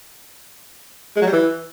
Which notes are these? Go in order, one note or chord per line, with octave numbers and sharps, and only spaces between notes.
G#3
F#3
G3
E3